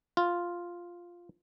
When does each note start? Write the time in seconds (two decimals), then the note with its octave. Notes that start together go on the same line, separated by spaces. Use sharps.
0.17 F4